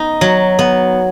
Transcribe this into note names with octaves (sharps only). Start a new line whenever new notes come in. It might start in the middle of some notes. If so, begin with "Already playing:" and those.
Already playing: B3 D#4
F#3
B3